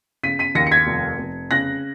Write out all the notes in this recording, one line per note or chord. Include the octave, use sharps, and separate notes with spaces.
C#3 B6 D#7
B6 D#7
D#2 A#6 C#7
C#7
G#6 B6
F1
F1
C#3 F#6 A#6